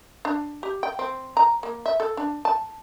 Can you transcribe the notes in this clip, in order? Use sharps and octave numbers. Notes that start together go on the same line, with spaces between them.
D4
G4
G5
C4
A#5
A#3
E5
A4
D4
A5